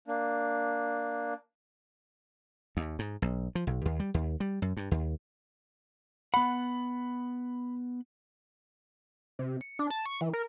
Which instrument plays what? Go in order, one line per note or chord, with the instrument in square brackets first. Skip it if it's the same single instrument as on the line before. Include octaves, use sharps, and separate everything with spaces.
[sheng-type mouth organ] A#3 D4
[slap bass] D#2
G#2
B1
F3
B1
D#2
G3
D#2
G3
F#2
G2
D#2
[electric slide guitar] B3 F#5 [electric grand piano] B5
[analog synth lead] C3
C#7
D4
A5
C#6
E3
A#4